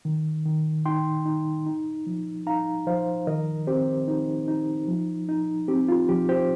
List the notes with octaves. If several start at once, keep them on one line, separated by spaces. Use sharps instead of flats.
D#3
D#3
D#4 G5 C6
D#4
D#4
F3
D#4 F5 A#5
F3 C5 F5
D#3 A#4 D#5
C4 G4 C5
D#4
D#4
F3
D#4
C4 G4
F4
F3 G4
G4 C5